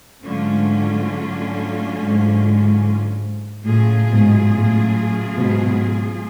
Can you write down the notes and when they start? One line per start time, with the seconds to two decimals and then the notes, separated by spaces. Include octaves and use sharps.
0.24 G#2 D3 F#3 A3 C#4 F4
1.96 G#2
3.65 A2 C#3 F#3 A3 F4 G#4
4.08 G#2 B2
4.51 A2
5.36 G#2 B2